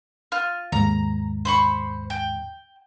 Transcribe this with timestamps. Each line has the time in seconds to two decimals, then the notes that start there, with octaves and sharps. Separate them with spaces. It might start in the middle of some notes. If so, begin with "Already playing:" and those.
0.32 F4 F6
0.72 D#2 G#2 A#5
1.45 C5 B5 C#6
2.10 G5